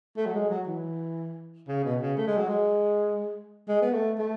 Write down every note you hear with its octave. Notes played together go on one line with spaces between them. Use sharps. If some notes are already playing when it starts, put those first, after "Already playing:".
A3
F#3
G#3
F#3
E3
C#3
B2
C#3
A3
G#3
F#3
G#3
G#3
B3
A3
A3